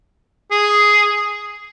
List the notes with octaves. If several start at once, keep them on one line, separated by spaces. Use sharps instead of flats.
G#4